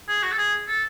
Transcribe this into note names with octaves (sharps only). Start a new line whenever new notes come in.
G#4
F#4
A4
G#4
A4